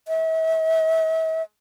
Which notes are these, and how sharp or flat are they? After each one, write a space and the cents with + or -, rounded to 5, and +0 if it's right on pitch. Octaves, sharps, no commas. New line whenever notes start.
E5 -40